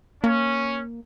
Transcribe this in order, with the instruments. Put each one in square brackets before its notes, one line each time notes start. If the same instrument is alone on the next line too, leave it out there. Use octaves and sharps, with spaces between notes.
[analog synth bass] A#3 [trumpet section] C#4